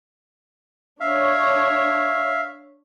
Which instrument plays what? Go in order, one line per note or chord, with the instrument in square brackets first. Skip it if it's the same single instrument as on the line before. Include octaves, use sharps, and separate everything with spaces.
[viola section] D4 C#5 [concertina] E5 F5